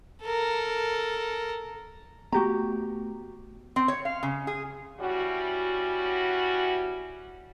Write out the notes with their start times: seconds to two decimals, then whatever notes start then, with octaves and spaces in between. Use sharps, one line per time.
0.23 A4 A#4
2.32 A3 B3 F#4 G4 A#5
3.76 C4
3.88 C#5
4.05 F5
4.23 C#3
4.47 G#4
5.00 G3 C#4 E4 F#4